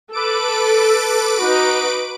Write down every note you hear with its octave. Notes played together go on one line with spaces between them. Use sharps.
A4 B4 D6 D7
D#4 F#4